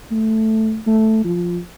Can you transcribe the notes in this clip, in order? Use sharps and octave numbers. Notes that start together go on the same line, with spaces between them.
A3
A3
F3